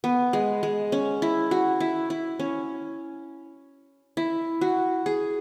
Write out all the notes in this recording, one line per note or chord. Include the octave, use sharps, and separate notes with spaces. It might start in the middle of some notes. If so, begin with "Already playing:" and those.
B3
G#3
G#3
C#4
E4
F#4
E4
E4
C#4
E4
F#4
G#4